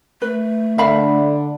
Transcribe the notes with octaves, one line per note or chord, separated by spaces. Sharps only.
A3 B4
D3 D4 E5 F5 B5